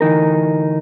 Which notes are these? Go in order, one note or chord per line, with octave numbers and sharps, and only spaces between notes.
D2 E3 D#4 A#4